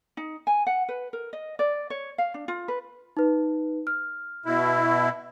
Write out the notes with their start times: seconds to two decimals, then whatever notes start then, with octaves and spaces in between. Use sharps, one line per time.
0.17 D#4
0.47 G#5
0.67 F#5
0.89 B4
1.13 A#4
1.33 D#5
1.59 D5
1.90 C#5
2.18 F5
2.34 D4
2.48 F4
2.68 B4
3.17 D#4 B4
3.87 F6
4.46 B2 E4